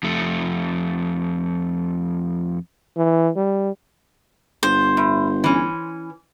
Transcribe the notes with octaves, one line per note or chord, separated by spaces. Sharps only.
F2 A3
E3
G3
G1 C5
A2
E3 C#4